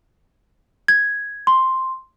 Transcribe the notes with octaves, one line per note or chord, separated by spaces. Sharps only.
G#6
C6